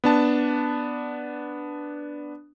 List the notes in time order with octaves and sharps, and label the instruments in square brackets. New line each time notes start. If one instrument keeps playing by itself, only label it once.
[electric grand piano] B3 D4 A5